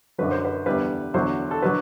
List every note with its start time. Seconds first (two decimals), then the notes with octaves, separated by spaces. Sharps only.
0.18 F#2 D3 F#3 B4
0.31 C5
0.45 B4
0.66 E2 D3 G3 B4
1.14 E2 D3 F#3 C5
1.51 A4
1.62 D3 F#3 B4